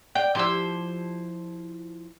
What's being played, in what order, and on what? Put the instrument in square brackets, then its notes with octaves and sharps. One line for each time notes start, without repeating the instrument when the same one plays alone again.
[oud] D5 [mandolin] G5
[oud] F3 E4 G4 [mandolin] C5 E6